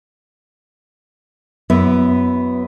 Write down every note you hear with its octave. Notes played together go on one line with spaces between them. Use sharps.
F#2 B3 E4 B4 E5